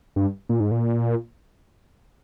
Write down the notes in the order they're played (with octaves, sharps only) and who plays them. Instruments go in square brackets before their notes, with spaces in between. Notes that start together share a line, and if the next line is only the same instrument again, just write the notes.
[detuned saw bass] G2
A#2
G#2
A#2